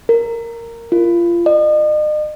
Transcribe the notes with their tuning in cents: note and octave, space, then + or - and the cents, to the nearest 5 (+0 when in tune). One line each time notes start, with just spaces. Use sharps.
A#4 -10
F4 -25
D#5 -45